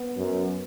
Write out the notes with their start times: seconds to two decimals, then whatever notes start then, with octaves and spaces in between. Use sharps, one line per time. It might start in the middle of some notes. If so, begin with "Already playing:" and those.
Already playing: B3
0.17 F#2